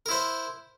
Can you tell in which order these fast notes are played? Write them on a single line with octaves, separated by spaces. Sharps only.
A#4 E4 C5